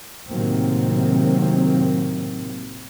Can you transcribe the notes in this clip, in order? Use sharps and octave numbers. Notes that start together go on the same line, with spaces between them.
A2 C3 D#3 F#3 A#3 C4